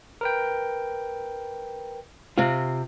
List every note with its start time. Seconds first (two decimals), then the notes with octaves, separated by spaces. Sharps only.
0.21 A#4 B4 G5
2.38 C3 C4 F4